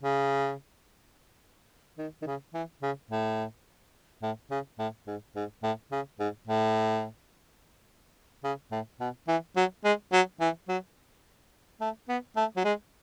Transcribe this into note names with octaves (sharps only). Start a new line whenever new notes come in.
C#3
D#3
D#3
C#3
E3
C#3
A2
A2
C#3
A2
G#2
G#2
A2
C#3
G#2
A2
C#3
A2
B2
E3
F#3
G#3
F#3
E3
F#3
A3
B3
A3
F#3
G#3